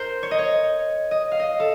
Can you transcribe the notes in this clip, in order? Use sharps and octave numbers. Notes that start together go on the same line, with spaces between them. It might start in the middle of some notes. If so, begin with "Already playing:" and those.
Already playing: A#4 C5
C#5
D#5
C#5
D#5
F5
D#5
A4